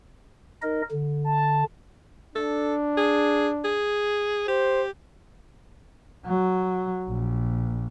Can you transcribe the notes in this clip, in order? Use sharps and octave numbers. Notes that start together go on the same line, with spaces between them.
D#4 A#4 D#5
D3
A5
D4 A4
G#4
G#4
G4 C5
F#3
A#1